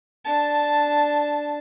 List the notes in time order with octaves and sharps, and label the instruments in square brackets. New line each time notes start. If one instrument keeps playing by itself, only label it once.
[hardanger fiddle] D4 A5